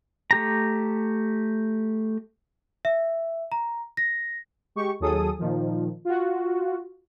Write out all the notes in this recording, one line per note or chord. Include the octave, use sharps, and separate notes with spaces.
A3 G4 A#5
E5
A#5
A#6
G#3 G4 C#6
D#2 F#3 G#4 A4 D#6
A#2 D#3 F3
F4 F#4